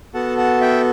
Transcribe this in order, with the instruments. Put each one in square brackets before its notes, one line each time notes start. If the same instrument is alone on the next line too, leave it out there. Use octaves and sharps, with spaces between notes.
[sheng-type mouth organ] B3 F#4 A4 F#5 A5
F#5 A5
E5 G5